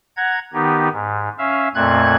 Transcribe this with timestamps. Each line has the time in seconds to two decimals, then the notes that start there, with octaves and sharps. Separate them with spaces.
0.17 F#5 A#5 G#6
0.53 D#3 B3 D#4 G4
0.92 G#2
1.38 C#4 E5 F5
1.75 F2 A#2 A3 C4 F#6 G#6